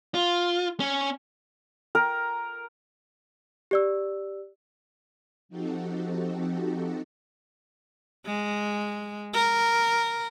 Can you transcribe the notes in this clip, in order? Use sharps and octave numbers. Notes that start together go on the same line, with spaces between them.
F4
C#4
A#4
G4 D5 E6
F3 C4 D#4 F#4 G4 A4
G#3
A#4